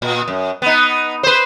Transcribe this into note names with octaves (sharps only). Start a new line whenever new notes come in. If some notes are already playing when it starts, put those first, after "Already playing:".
A#2
F#2
B3 D#4
B4 C5